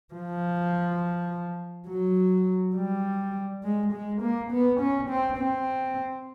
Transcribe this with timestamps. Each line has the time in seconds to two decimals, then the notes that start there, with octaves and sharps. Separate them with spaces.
0.14 F3
1.88 F#3
2.76 G3
3.64 G#3
3.92 G#3
4.21 A#3
4.51 B3
4.80 C#4
5.10 C4
5.38 C4